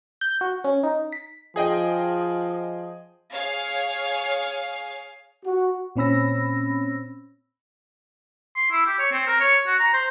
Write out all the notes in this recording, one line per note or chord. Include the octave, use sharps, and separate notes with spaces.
G6
F#4
C#4
D#4
B6
F3 G#4 D#5 G5
G#4 C#5 F5
F#4
A#2 C4 C#4 B5 E6 A#6
C6
E4
G4
C#5
C4
A#4
C#5
F#4
A#5
C5